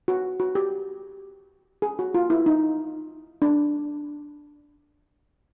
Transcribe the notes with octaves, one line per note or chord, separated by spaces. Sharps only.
F#4
F#4
G4
G#4
F#4
F4
E4
D#4
D4